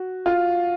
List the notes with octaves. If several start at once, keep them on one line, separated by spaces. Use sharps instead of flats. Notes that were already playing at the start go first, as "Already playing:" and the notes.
Already playing: F#4
F4